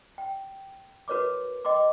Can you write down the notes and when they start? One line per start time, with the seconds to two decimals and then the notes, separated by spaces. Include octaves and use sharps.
0.18 G5
1.08 F#4 A#4 B4 C#5 C#6 D6
1.65 D#5 G5 C6 D6